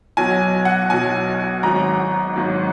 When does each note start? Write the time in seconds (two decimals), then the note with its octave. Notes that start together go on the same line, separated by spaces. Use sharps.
0.17 B1 B2 F#3 G#5
0.65 F#5
0.90 B1 B2 F#3 G#5
1.63 G#1 G#2 F#3 A#5
2.36 G#1 G#2 F#3